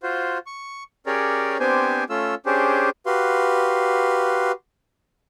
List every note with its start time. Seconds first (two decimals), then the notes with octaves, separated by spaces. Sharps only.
0.03 F4 F#4 C5
0.46 C#6
1.06 C#4 G4 G#4 A#4 C#5 D5
1.60 B3 C4 D4 G4 C5 G#5
2.10 A3 C#4 F4 E6
2.46 C#4 D4 G4 G#4 C5
3.06 F#4 G4 B4 F5 C6